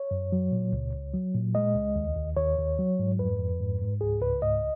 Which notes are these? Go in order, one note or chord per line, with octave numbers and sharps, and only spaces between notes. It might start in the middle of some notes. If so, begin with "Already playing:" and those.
Already playing: C#5
F#2
F#3
A#2
C#2
C#2
F#3
A#2
G#3 D#5
C#2
D#2
D#2
D#2 C#5
D#2
F#3
G#2
F2 B4
F2
G#2
G#2
C#2 G#4
C#2 B4
G#2 D#5